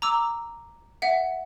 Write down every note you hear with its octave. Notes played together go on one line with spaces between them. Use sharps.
A#5 D6 E6
E5 F#5